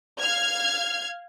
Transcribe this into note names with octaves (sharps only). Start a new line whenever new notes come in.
F5 F6 G#6